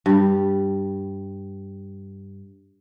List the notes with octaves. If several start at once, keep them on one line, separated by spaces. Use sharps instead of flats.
G2 G3